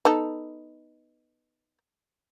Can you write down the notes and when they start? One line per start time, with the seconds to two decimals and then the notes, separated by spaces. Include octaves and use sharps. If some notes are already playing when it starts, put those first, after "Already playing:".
0.05 B3 D#4 A4